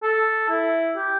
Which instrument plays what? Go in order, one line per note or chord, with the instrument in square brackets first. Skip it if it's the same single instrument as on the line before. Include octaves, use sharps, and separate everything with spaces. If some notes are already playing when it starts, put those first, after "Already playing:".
[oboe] A4
E4
G4